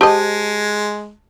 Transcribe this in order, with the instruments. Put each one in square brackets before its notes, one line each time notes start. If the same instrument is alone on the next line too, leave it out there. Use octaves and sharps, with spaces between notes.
[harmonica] G#3 [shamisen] G4 C5 D#5 [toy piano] A5